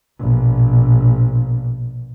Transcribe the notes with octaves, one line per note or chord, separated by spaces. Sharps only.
A#1 B2